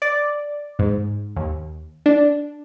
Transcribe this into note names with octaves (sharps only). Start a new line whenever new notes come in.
D5
G#2
D#2
D4